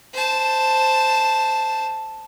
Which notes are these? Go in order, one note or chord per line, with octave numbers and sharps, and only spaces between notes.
C5 A5